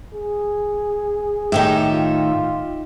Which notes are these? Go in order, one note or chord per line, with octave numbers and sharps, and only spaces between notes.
G#4
A2 D#3 D#4 G4 E5
F4